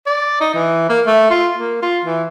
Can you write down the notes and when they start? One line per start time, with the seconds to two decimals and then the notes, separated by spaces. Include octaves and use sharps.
0.06 D5
0.41 D#4
0.54 E3
0.89 A#3
1.07 A3
1.30 F4
1.57 A#3
1.82 F4
2.04 E3